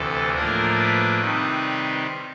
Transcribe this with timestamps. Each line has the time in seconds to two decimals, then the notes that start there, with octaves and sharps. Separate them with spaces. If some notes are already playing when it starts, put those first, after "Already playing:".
Already playing: D2 C3 E3 A4
0.33 A2 F3 A#3 D4 A#4
0.77 B4
1.21 C3 D#3 G3 C4 D#4